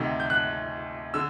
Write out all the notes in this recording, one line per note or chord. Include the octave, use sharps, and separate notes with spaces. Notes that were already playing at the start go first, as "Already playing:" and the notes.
Already playing: D2 C3 D#3
G6
F#6
D3 E6